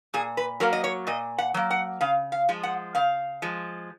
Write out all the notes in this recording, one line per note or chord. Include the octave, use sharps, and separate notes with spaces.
A#2 G#4
B4
F#3 A#3 A#4
D#5
C#5
A#2 D#5
F#5
F#3 A#3
F#5
C#3 F5
F5
F3 G#3
F#5
C#3 F5
F3 G#3